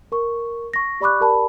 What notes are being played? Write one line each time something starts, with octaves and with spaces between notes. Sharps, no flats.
A#4 C#6
C#6 A#6
G4 D5 B5 C#6 D6 F#6
G4 A#4 D5 A5 B5